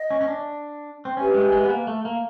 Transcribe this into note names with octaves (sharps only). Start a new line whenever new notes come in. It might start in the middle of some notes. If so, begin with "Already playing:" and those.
Already playing: D#5
C#4
C#4
D4
C4
C#4 G4 B4 E5 G#5
G#3
G#3
B3
A#3
A3
A#3